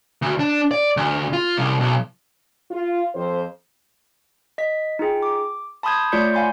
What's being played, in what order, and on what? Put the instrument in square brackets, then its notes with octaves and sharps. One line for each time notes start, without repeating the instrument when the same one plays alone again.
[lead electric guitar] D2
D4
D5
D2
F4
C2
B1
[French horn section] F4
F2 C5
[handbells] D#5 B6
D#4 F4 G#4 G5
D6
A5 B5 C6 D#6 G6 G#6
A3 F4 C#5 D5 G6 C#7
F5 F#5 G#5 B5 C6